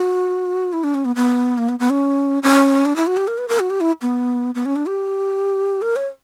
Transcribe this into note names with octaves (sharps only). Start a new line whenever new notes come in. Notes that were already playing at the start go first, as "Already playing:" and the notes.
Already playing: F#4
E4
D4
C#4
B3
B3
A#3
B3
B3
C#4
C#4
D4
E4
F#4
G4
A#4
B4
A#4
F#4
G4
E4
B3
B3
C#4
D4
G4
A#4
C#5